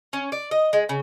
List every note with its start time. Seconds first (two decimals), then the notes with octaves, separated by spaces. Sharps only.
0.13 C#4
0.32 D5
0.51 D#5
0.73 G#3
0.89 C#3